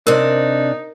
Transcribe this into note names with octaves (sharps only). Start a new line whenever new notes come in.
C3 D4 D#4 A#4 C5